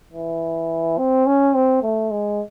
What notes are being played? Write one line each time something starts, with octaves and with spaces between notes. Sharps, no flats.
E3
C4
C#4
C4
A3
G#3